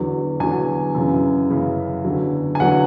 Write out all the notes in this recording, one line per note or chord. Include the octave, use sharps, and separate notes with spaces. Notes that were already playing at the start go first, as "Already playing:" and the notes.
Already playing: E2 D3 F#3
E2 D3 F#3 G#5
F#2 C#3 E3
F#2 C#3 E3
E2 D3 F#3
G#5
E2 D3 F#3 F#5